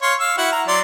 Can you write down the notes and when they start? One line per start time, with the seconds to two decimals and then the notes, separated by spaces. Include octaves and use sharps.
0.02 C#5 F5 C6
0.20 F5 E6
0.38 E4 F#4 F#5
0.52 A#5
0.68 F#3 D5 C6